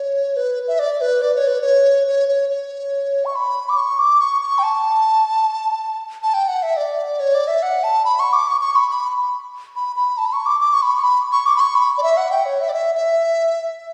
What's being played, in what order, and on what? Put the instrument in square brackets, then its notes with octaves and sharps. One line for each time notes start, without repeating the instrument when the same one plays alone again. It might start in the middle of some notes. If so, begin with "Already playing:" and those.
Already playing: [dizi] C#5
B4
E5
D5
B4
D5
C#5
B4
C#5
C#5
C#5
C#5
C#6
B5
D6
C#6
D6
C#6
C#6
G5
A5
A5
G5
F#5
E5
D5
C#5
D5
E5
F#5
A5
B5
C#6
D6
C#6
C#6
B5
B5
B5
B5
A5
B5
C#6
D6
D6
C#6
B5
C#6
B5
C#6
D6
B5
C#6
B5
D5
E5
F#5
G5
C#5
E5
D5
E5
E5